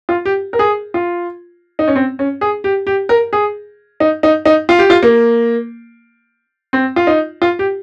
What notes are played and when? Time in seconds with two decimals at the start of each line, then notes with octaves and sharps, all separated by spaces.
0.09 F4
0.25 G4
0.53 A#4
0.59 G#4
0.94 F4
1.79 D#4
1.88 C#4
1.96 C4
2.19 C#4
2.41 G#4
2.64 G4
2.87 G4
3.09 A#4
3.33 G#4
4.00 D#4
4.23 D#4
4.46 D#4
4.69 F4
4.79 G4
4.90 F4
5.03 A#3
6.73 C4
6.96 F4
7.07 D#4
7.42 F4
7.59 G4